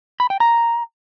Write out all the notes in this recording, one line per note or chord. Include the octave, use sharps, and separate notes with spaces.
B5
G5
A#5